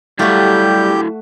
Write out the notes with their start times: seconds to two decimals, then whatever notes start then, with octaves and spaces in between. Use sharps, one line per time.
0.19 F#3 G3 A3 E4 F#4 G4 F5 G6